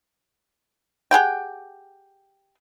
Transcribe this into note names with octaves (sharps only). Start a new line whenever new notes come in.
G4 G#4 F#5 G5